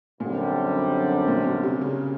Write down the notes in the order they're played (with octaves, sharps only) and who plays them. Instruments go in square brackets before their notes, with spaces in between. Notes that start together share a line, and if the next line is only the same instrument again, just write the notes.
[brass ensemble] F#2 D3 G3 C4 [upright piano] A#2
[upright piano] A#2
B2
C3
C#3